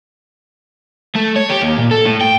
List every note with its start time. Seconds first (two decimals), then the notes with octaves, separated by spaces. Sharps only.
1.15 A3
1.36 C#5
1.49 G4
1.61 D#2
1.78 A#2
1.91 A4
2.06 A2
2.21 G5